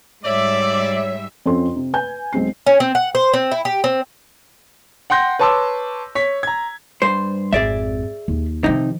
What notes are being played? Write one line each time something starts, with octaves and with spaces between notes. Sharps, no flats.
G#2 G3 C#5 D5 E5
F2 C4 C#4 F4 A4 C6
C3
B4 G#5 G6
B1 G#3 C4 C7
C#4
C4
F#5
C5
C4
E4
G4
C4
F#5 G5 C6 G6 A#6
B4 C#5 A5 C6 D6 E6
C#5 B6
A#5 G#6
G2 C5
G#1 F2 G#4 D5 E5
D#2
C3 D#3 F3 D#4